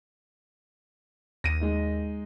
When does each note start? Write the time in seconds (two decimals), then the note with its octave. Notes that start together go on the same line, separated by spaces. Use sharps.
1.44 D#2 A#6 D#7
1.61 G#3 D#4